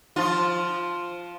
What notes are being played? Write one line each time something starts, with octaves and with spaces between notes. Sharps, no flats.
F3 F4